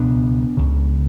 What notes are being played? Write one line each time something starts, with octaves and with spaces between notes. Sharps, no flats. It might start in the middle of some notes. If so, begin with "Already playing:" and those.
Already playing: C#2 B2 B3 D4
C#2 C#3